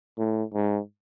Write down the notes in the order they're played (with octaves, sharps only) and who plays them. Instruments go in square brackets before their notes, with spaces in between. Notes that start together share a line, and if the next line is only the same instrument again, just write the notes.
[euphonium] A2
G#2